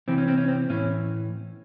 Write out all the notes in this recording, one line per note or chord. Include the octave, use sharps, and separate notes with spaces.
C3 E3 C4
C#4
C4
C#4
C4
A2 E3 C#4